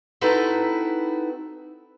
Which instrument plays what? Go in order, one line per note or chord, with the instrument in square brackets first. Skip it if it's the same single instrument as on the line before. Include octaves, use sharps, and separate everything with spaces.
[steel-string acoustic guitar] C4 D#4 E4 F#4 A4 B4